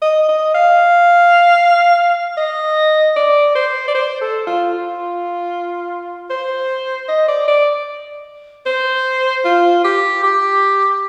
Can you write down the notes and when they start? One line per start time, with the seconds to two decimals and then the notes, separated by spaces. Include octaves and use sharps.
0.02 D#5
0.29 D#5
0.55 F5
2.37 D#5
3.17 D5
3.56 C5
3.88 D5
3.95 C5
4.22 A4
4.47 F4
4.73 F4
6.30 C5
7.09 D#5
7.28 D5
7.48 D5
8.66 C5
9.45 F4
9.85 G4
10.24 G4